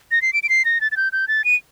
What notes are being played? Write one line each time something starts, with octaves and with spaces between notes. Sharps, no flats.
A#6
C7
D7
D7
C7
A#6
A6
A6
G6
G6
A6
D#7